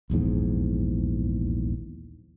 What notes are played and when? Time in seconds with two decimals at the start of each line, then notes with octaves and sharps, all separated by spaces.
0.10 D#1 A#1 E2 G#2